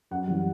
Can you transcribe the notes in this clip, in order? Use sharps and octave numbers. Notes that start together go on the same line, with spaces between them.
F#2 F#5
E3 G3